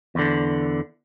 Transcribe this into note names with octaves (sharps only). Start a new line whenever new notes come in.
E2 D3